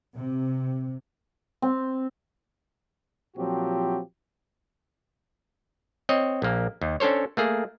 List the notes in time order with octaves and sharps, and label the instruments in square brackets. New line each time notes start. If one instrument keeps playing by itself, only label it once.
[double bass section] C3
[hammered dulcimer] C4
[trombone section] A#2 F3 F#3 C4 F#4 G4
[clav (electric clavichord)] C4 C#5 D#5
A#1 A#3
D#2
C#4 D4 A4 C5 C#5
A3 A#3 G#4